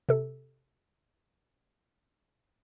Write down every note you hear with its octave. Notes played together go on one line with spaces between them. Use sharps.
C3 A4